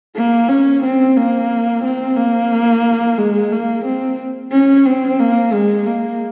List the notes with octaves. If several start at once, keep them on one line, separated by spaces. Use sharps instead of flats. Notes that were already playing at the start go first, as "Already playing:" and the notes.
A#3
C#4
C4
A#3
C4
A#3
G#3
A#3
C4
C#4
C4
A#3
G#3
A#3